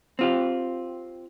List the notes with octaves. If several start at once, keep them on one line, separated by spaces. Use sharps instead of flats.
C4 F4 G4